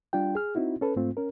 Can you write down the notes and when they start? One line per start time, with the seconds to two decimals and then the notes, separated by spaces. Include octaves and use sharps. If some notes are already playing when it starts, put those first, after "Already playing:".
0.13 G3 D4 F4 G5
0.35 G#4 F6
0.55 C4 D#4 E4 F#4
0.81 C#4 A4 B4
0.96 G#2 A3 C4 F4
1.17 C#4 A#4